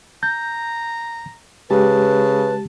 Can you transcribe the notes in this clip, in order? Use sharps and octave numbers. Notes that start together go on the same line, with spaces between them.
A#5 G6
C#3 G#3 G4 B4 A5